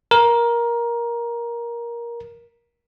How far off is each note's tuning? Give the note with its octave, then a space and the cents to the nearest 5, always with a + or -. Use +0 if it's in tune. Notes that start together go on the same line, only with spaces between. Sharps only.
A#4 +15